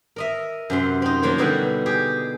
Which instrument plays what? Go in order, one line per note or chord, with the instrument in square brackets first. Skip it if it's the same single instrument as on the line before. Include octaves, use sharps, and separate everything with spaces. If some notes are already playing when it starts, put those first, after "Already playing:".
[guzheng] A#4 D#5 E5
F#2 C3 C6
C4 D#4
F3 F#3 A#3 F#4 C#5
B2 D3 G3 D#4 F#4
G4 G#4